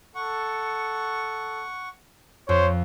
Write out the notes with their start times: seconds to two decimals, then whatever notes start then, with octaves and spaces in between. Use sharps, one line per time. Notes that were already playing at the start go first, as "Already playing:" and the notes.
0.15 A4 F#5 C#6
2.49 F2 C5 C#5